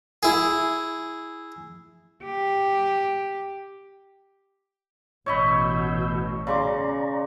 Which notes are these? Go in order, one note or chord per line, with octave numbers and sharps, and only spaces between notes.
E4 G#4
G4
A1 B2 C#5 D#5 B5 E6 G6
C#3 D5 A#5 C6 D6